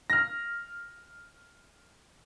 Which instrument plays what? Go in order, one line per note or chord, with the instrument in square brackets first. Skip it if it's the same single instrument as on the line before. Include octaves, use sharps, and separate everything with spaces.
[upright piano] F6 A#6